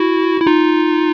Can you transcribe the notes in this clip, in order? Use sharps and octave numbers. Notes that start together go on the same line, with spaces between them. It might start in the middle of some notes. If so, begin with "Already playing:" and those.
Already playing: E4 F#4
E4
D#4 F4